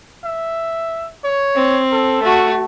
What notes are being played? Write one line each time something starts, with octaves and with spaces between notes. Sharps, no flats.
E5
C#5
C4
A4
A3 F#4